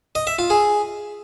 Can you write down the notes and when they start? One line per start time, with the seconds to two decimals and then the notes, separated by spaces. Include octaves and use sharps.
0.15 D#5
0.27 E5
0.39 F4
0.50 G#4